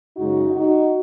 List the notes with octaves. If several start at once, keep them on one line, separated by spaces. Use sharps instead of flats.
F#2 C#3 G#3 D#4 F#4
D#4 F#4